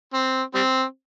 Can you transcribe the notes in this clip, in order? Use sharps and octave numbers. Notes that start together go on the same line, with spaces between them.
C4
G3 C4